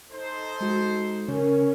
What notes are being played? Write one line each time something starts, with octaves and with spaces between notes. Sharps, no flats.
D#4 A4 C5
G#3 F#4
C#3 C#4 A#4